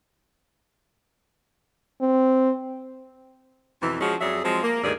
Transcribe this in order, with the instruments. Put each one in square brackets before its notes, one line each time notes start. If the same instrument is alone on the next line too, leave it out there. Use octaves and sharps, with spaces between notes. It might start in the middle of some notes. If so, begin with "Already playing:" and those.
[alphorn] C4
[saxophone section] F2 B2 E3
F3 G#3 C#4 F#4 G#4
F2 F#3 G#4 D5 E5
F3 F#3 G#3 C4 C5
A#3
D2 G2 D#3 G#4 D5